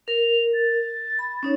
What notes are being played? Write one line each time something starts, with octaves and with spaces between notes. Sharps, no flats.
A#4 F7
A6
B5
C#4 D#4 C#5